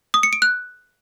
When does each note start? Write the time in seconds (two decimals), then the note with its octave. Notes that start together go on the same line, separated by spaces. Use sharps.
0.14 D#6
0.23 C#7
0.33 D7
0.42 F#6